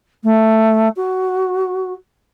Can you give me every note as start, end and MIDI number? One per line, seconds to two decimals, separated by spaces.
0.23 0.88 57
0.96 1.93 66